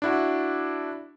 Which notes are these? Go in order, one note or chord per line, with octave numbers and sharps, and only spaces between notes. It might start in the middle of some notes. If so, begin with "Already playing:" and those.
D4 E4 F#4